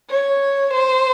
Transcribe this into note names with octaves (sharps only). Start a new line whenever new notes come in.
C#5
C5